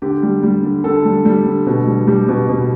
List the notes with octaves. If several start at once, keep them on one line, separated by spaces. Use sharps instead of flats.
D3 G4
G3
G3
D3
D3 A4
G3
G3
D3
B2
G3
G3 G4
B2
B2